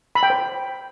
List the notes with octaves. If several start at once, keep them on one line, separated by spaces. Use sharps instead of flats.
B5
G5
C5